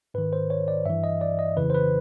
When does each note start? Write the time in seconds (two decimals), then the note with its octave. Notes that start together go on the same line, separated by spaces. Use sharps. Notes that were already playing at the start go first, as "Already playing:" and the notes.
0.14 G#2 D#3 B4
0.33 C5
0.50 C#5
0.68 D5
0.86 G2 E3 E5
1.04 D#5
1.21 D5
1.39 D#5
1.57 F2 C#3 E3 B4
1.70 C5
1.75 B4